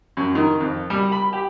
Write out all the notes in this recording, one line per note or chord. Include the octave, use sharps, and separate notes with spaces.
F#2
D#3
F2
G3
B5
G4